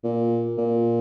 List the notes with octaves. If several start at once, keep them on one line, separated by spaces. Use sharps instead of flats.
A#2
A#2